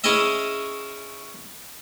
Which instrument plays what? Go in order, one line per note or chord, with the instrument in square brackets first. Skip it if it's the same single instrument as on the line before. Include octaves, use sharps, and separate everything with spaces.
[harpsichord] C#4 E4 G#4 D#5 E5